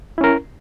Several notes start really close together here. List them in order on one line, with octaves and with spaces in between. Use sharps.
E4 C#4 A#4